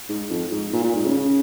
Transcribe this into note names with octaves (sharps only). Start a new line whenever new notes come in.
G#2
F2
G#2
A#2
A#2
G#2
C#3
C#3